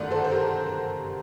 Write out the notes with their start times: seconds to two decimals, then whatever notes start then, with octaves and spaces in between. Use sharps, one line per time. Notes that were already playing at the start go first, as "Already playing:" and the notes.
Already playing: G1 F#2 D#3 A3 D5 F#5
0.11 A4 C5
0.24 C5
0.31 G4 A#4